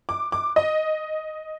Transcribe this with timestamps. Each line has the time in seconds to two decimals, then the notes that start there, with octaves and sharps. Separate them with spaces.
0.09 D6
0.32 D6
0.56 D#5